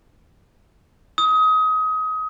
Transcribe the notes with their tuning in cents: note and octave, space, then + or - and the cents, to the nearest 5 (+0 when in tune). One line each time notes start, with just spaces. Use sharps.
D#6 +25